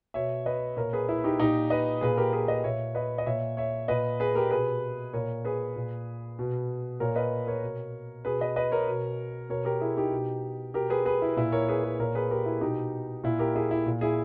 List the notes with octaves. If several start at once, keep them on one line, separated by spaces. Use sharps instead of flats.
B2 C#5 E5
B4 D#5
A#2 A#4 C#5
G#4 B4
E4
D#4 G4
A#2 D#4 G4
B4 D#5
A#2 G#4 B4
G4 A#4
G#4 B4
B4 D#5
A#2 C#5 E5
B4 D#5
D#5
A#2 C#5 E5
C#5 E5
A#2 B4 D#5
G#4 B4
G4 A#4
B2 G#4 B4
A#2 A#4 C#5
G#4 B4
A#2
B2
A#2 A#4 C#5
B4 D#5
A#4 C#5
B2
B2 G#4 B4
B4 D#5
B4 D#5
A#4 C#5
B2
B2 A#4 C#5
G4 A#4
E4 G#4
D#4 G4
B2
B2 G4 A#4
G#4 B4
G#4 B4
E4
A#2 E4
A#4 C#5
G#4 B4
G#4 B4
A#2 A#4 C#5
G#4 B4
G4 A#4
E4 G#4
B2 D#4 G4
A#2 E4
G4 A#4
E4 G#4
E4
A#2
E4 G#4